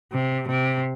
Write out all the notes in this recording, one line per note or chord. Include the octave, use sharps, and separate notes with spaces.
C3
C3